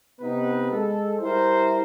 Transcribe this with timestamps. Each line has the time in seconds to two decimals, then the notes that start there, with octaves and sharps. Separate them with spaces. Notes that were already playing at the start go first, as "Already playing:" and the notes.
0.21 C3 B3 D#4 B4
0.71 G#3 A4
1.19 G3 E4 A#4 C5